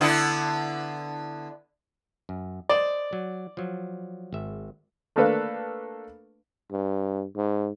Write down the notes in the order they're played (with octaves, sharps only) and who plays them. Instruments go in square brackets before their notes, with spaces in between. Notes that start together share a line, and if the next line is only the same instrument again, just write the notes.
[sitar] D3 B3 E4
[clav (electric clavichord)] F#2
[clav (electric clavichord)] C5 D#5 [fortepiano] D5
[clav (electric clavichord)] F#3
F3 F#3
G#1 E5
[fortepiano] A3 A#3 D4 A4 B4 F5
[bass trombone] G2
G#2